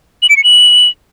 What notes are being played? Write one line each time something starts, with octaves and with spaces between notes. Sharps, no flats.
F#7
D7
C#7
F#7